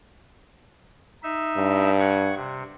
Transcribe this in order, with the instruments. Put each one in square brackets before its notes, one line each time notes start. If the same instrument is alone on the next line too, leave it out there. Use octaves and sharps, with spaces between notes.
[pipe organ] D#4 E5
[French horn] G2
[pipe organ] F#5 C#6 G#6
C3